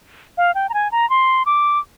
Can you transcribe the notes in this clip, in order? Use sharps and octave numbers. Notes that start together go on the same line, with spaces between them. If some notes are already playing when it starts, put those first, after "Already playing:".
F5
G5
A#5
G#5
A#5
C6
D6